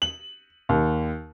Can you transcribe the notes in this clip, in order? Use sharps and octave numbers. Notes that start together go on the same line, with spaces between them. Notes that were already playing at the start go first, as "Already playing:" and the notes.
F#7
D#2